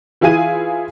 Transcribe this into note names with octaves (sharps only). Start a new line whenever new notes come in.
E3 E4 F4 G#4 G#5 D#7